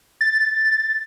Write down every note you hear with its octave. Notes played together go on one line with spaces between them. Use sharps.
A6